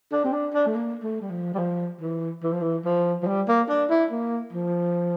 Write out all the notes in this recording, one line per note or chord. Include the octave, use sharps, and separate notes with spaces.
D4
C4
D4
D4
A3
A#3
A3
G3
F3
G3
F3
E3
E3
F3
E3
F3
F3
G3
A#3
D4
E4
A#3
F3